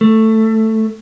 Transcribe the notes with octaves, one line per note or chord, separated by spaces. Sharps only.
A3